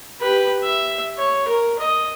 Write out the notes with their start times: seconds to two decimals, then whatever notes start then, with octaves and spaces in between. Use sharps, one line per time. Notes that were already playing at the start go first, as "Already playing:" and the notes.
0.21 G4 B4
0.63 E5
1.18 C#5
1.48 A#4
1.79 D#5